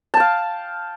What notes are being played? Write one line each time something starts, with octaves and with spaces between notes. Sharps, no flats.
F5 G5 A5